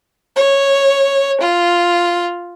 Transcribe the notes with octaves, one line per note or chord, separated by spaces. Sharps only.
C#5
F4